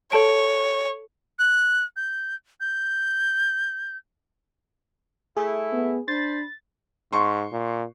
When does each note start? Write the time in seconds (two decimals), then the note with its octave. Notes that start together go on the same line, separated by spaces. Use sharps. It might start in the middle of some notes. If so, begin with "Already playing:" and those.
0.12 A4 C#5 A5 D7
1.39 F#6
1.96 G6
2.60 G6
5.37 A3 E4 G#4
5.72 B3
6.08 D4 C5 B5 A6
7.13 G#2 C6 C#6
7.52 A#2